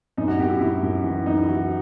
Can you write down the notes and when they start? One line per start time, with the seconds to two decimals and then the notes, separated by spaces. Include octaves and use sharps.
0.17 F#2 D#4
0.28 F#4
0.39 F#2 G4
0.50 E4
0.60 F#2 E4
0.83 F#2
1.04 E3
1.26 F#2 D#4
1.37 E4
1.48 E3 F#4